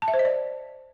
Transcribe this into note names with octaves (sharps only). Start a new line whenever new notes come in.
A5
E5
C5
D#5
D5